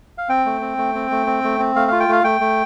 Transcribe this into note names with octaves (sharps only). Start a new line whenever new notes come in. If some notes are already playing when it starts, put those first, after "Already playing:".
F5
C4 G5
A3
C4
A3
C4
A3
C4
A3
C4
A3 F5
F4 F5
G5
A3 F5
A3 G5
A3